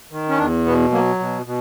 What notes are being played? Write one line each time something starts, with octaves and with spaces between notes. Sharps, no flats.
D#3
C#4
E2 D4
B2 B3
F#3 A#3
B2
B2